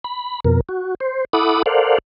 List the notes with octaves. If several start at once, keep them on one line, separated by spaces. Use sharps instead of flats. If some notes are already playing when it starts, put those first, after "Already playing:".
B5
F2 B2 A#4
F#4
C5
E4 A4 F#5 B5 D6 D#6
A4 A#4 C5 D5 F5 F#5